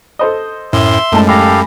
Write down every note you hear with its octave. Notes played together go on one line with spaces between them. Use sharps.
A4 C5 D#5
F#2 A2 E5 C6
F#2 A2 F#3 G#3 A3 D#4 A5
G4 A4 F5 G#5 B5 A#6